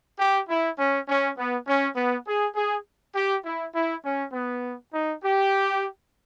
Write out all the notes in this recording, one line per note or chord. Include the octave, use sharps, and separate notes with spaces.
G4
E4
C#4
C#4
B3
C#4
B3
G#4
G#4
G4
E4
E4
C#4
B3
D#4
G4